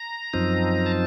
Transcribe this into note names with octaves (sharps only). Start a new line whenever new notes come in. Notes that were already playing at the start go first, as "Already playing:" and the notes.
Already playing: A#5
F#2 F3 C4 D#4
A5